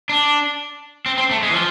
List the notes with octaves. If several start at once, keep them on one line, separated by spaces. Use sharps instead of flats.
D4
C4
C4
A3
G#3
E3
F3